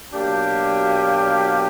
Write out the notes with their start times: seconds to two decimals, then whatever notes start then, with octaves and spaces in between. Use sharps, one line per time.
0.11 B2 F#3 A#3 D4 G4